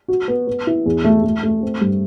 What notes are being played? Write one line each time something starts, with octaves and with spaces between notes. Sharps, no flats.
F#4
B3
B3
E4
E2
A3
A3
A3
C4
G2